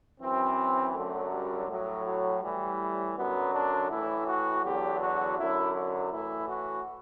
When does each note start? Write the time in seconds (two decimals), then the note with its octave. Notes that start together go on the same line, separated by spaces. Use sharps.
0.20 F#2 E3 C4
0.94 F#2 D3 F#3 A3
1.31 G3
1.69 A2 F#3
2.04 F#3
2.42 A2 E3 G3
3.16 F#2 D3 F#3 B3
3.53 D4
3.89 A2 E3 E4
4.26 F#4
4.63 E2 D3 F#3 G4
5.01 F#4
5.37 F#2 D3 F#3 E4
6.10 A2 E3 E4
6.48 F#4